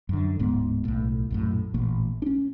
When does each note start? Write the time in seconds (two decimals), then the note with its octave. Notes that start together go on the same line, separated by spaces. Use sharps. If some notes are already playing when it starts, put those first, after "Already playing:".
0.09 F#2 D3
0.39 D1 G#2 B3
0.85 B1 A2
1.30 A#1 F#2 A2
1.74 A1 A#2 A#3
2.22 C#4 D4